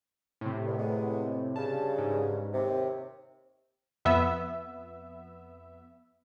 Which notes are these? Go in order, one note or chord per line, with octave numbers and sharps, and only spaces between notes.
A2 C3
C2 G2
F#3 G#3 B3
G2 C#3 A5
G#2
D#2 C3
F2 B3 E5